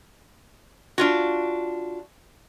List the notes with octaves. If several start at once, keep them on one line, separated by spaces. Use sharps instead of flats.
D4 F4 F#4